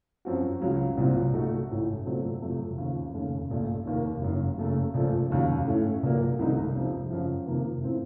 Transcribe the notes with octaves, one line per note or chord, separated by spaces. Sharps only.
F#2 F3 C4 F#4
C#2 C#3 F#3
C2 A#2 F#3 C4 F4
A#2 A3 D#4 F#4
A1 A2 A3
A#2 F#3 A3 C4
F2 C3 F#3 A3
D#2 C#3 F3
F1 D#2 C#3 A3 C#4
A#1 A#2 A3 C#4 F4
F1 D#2 D#3 A#3
F#1 F#2 C#3
F#1 F#2 C#3 A3
A#1 A#2 F3 A3
F1 D#2 C#3 F#3
A2 A3 C#4
A#1 A#2 F#3 A#3
C2 C3 D#3 A3 D#4
F1 F2 C3 F3
F#2 C#3 F3
F2 C3 D#3 A#3
A2 F3 C4